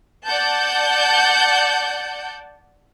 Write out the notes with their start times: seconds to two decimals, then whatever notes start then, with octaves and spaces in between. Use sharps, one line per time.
0.25 D5 F#5 A5 G6